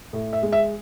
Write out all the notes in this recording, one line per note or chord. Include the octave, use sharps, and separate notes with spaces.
A2
E5
G#3
E5